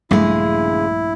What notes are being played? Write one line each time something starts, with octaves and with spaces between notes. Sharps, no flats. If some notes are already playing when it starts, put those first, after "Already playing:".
A#1 G2 C#3 G#3 A3 E4